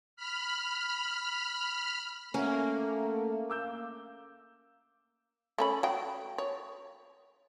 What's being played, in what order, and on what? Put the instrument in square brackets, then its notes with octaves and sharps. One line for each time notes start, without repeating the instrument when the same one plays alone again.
[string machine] B5 F6
[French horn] A3 [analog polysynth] A#3 [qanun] C#4 [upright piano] E5 F#5 A#5
[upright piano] D6 E6 G6
[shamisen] A3 C#4 B5
F#3 G5
C#5